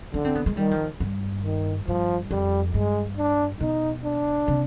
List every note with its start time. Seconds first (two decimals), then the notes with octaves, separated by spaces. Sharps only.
0.14 D3 D4
0.25 C4
0.35 B3
0.46 G#3
0.57 D#3 G3
0.71 F3
1.00 G2
1.44 D#3
1.87 G2 F3
2.31 F2 G3
2.74 G2 G#3
3.17 D4
3.60 B2 D#4
4.04 D4
4.48 C3